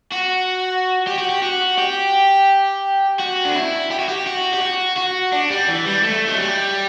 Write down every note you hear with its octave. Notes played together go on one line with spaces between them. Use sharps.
F#4
G4
F#4
G4
F#4
G4
F#4
D4
E4
G4
F#4
G4
F#4
G4
F#4
F#4
D4
G3
E3
G3
A3
F#3
G3